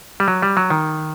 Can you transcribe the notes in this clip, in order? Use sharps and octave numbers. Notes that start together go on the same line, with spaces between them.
G3
F#3
G3
F#3
D#3